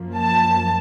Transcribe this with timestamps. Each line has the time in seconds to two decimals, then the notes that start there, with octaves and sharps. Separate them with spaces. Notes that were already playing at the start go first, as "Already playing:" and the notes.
Already playing: F#2 F3 A#3
0.16 A5